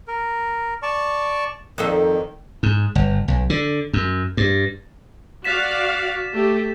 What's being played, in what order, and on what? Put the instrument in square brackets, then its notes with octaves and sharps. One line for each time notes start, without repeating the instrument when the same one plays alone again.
[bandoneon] A#4
D5 A5 C#6
[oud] F2 D#4 A4 [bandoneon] D#3
[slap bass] G#2
G1
B1
D3
F#2
G2
[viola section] F#4 D5 F5 [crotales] A6 B6 E7
[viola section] A3 G4